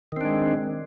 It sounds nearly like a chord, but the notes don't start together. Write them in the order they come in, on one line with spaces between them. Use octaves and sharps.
D#3 C4 D4 G#3